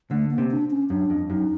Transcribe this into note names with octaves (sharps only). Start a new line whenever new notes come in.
D3 A3
A#3
C3
D4
C#4
F#2 D4
F2
F#2 D#4